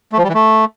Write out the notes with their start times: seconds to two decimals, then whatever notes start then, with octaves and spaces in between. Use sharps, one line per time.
0.12 A3
0.18 F3
0.23 G3
0.29 E3
0.34 A3